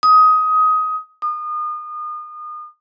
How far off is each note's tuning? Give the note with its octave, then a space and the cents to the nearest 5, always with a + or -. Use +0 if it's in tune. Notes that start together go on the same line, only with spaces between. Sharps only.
D#6 +15
D#6 -35